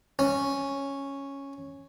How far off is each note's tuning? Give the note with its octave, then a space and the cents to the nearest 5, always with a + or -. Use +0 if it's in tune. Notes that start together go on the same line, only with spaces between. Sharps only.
C#4 -5